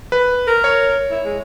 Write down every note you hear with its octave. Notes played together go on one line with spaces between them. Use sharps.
B4
A#4
C#5
E4
G#3